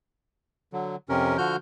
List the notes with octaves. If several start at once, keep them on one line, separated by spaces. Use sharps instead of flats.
D3 F#3
F2 C3 C#4 A#4
D3 F3 F#4 F6 G6